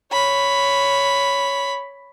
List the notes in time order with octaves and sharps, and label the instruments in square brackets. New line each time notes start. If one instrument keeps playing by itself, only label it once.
[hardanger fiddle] C#5 B5